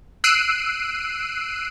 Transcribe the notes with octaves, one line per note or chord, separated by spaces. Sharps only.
E6 F#6 C7 D7 D#7